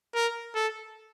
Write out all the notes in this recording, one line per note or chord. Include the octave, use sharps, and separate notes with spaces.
A#4
A4